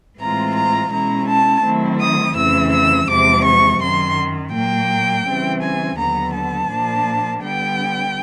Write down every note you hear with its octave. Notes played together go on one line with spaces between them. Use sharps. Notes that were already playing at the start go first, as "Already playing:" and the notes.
A2 E3 G#3 C4 F4 A#5
A#5
B2 G#3 C#4 E4 A#5
A5
D#3 F#3 A3 C4 E4
D#6
F2 C#3 E3 A3 E6
E6
E2 C3 F3 G#3 D6
C#6
F#2 D#3 F#3 C6
A#2 F#3 A#3 G5
C#3 E3 G3 C4
G#5
D#2 D3 F#3 B3 A#5
A5
A#2 F3 A#3 D4
D3 G3 B3 G5